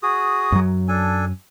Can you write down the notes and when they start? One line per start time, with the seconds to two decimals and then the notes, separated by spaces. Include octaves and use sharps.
0.03 F#4 G#4 D#6
0.52 F#2 F#3
0.88 D4 A4 G#5